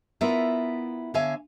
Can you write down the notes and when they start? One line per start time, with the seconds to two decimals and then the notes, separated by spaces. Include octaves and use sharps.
0.21 B3 E4 F4 A#4 D5 E5
1.14 D3 C#5 E5 F5 G#5